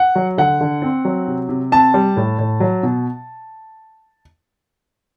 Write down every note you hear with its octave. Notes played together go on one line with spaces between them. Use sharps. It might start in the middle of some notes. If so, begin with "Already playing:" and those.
Already playing: F#5
F#3
D3 F#5
D3
C4
F#3
C3
C3
C4 A5
G3
A2
A2
F#3
B2